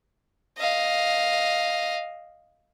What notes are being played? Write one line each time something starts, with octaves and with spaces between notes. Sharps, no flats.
D#5 F5